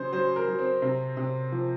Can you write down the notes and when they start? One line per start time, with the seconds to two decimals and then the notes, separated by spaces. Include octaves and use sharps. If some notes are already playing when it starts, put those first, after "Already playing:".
Already playing: C#3 F#3 C5
0.12 F#3 C5
0.36 A#4
0.48 F#3
0.59 C4
0.82 C3
1.17 C3
1.52 F3